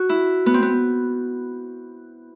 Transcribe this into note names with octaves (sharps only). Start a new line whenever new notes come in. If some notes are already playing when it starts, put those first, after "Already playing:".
Already playing: F#4
E4
B3
C4
B3